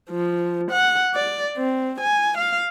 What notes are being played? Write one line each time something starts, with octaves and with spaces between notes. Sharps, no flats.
F3
F#5
D5
C4
G#5
F5